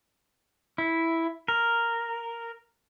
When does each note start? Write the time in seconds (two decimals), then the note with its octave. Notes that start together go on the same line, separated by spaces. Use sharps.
0.78 E4
1.48 A#4